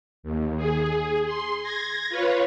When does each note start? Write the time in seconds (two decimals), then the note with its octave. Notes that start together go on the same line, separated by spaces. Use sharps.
0.23 D#2
0.57 G#4
1.25 C6
1.62 G#6 A#6
2.09 F4 B4 C#5